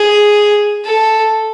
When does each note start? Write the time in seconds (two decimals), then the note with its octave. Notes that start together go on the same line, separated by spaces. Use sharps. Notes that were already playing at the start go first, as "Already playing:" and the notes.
Already playing: G#4
0.84 A4